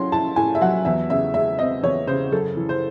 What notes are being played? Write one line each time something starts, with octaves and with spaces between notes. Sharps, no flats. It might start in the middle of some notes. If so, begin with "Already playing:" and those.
Already playing: A2 F#3 C#4 C6
E4 A5
A2 G#5
E5
F#3 F#5
E2 E5
C#3 E5
G#3 E5
C4 D#5
E2 C#5
C#3 C5
F#2 A4
E3
C5